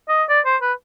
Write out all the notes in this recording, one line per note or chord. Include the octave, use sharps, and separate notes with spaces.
D#5
D5
C5
B4